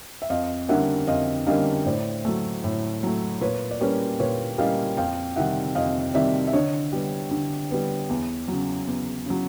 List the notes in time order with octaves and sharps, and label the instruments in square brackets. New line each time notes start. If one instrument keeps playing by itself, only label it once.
[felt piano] E5
F2 D#5 F5
D3 G3 A#3 C#4 E5 F#5
F2 D#5 F5
D3 G3 A#3 C#4 D#5 F5
A2 C5 D5
F#3 A3
A2
F#3 A3
A#2 B4 C#5
D5
G3 A#3 C#4 B4 C#5
A#2 B4 C#5
G3 A#3 C#4 D#5 F5
F2 F5 G5
C3 D#3 G3 E5 F#5
F2 D#5 F5
C3 D#3 G3 D5 E5
E5
D3 C#5 D#5
G3 B3
D3
G3 B3
E2
C#3 F#3
E2
C#3 F#3